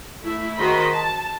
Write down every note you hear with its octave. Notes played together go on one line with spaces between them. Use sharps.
A3 E4
D#3 F#4 G#4 C5 D#5 B5
A5